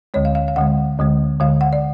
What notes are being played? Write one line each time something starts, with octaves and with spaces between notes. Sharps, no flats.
D2 D3 G#3 C#5
F5
F5
F5
D2 D3 G#3 F#5
D2 D3 G#3
D2 D3 G#3 F5
F#5
D5